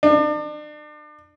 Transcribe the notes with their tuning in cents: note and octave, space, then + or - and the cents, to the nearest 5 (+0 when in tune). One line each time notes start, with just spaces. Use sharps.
D4 +40